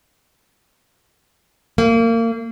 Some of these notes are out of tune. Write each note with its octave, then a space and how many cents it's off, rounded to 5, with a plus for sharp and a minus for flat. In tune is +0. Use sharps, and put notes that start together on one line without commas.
A#3 -30